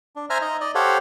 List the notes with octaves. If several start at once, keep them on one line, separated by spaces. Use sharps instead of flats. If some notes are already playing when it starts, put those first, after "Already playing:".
D4
C5 E5 G#5 A#5 F6
D#4 D#5 A#5
D5 D#5
G4 A4 C5 C#5 F5 F#5